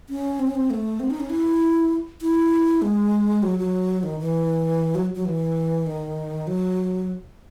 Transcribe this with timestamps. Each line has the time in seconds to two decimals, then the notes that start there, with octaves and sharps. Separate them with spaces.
0.09 C#4
0.39 C4
0.47 C#4
0.55 C4
0.70 A3
1.00 C4
1.10 D#4
1.20 C#4
1.30 E4
2.22 E4
2.82 G#3
3.43 F#3
3.59 F#3
4.03 D#3
4.20 E3
4.95 F#3
5.15 F#3
5.25 E3
5.86 D#3
6.47 F#3